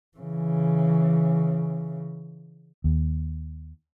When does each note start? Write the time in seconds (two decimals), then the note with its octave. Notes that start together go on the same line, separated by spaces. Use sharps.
0.18 C#3 E3
2.84 D#2